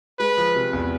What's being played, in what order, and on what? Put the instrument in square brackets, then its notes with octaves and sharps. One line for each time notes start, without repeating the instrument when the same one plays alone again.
[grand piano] G#3 [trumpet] B4
[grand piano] F3
C3
E2